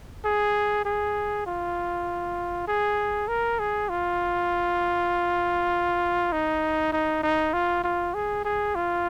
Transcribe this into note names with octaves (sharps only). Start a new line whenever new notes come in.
G#4
G#4
F4
G#4
A#4
G#4
F4
D#4
D#4
D#4
F4
F4
G#4
G#4
F4